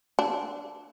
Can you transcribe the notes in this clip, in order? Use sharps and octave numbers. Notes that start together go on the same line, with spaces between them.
D4